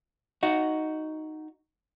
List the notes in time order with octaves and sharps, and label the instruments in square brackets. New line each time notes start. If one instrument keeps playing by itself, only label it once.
[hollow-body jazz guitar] D#4 F#4